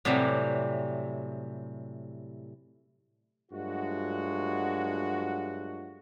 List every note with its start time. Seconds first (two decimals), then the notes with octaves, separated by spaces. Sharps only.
0.05 A2 C3 E3 F#3 G3
3.52 G2 F#3 G#3 A3 F4 F#4